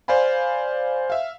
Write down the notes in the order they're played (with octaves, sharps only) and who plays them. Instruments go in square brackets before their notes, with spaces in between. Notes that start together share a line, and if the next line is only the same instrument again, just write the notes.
[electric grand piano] C5 D5 F5 G#5 B5
E5 F5